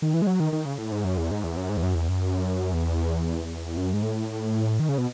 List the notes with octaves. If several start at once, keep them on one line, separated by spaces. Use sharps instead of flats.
D#3
E3
G#3
F#3
D#3
D#3
C#3
A2
G#2
F#2
E2
G#2
E2
F#2
G#2
E2
F#2
E2
F#2
E2
F#2
G#2
A2
D#3
C#3
B2